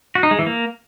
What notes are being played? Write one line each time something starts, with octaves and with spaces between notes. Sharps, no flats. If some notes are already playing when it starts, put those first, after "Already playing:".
F#4
D#4
G#3
E3
A#3